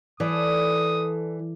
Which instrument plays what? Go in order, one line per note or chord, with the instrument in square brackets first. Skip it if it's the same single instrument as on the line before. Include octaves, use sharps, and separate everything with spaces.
[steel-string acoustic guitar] E3 [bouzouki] A4 [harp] D5 [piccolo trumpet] D#6